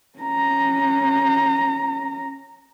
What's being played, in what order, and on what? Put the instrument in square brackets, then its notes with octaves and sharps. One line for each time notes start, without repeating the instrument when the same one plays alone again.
[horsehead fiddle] C#4 A#5